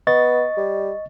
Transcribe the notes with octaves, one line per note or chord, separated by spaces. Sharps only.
B3 D#5 C#6 A6
G3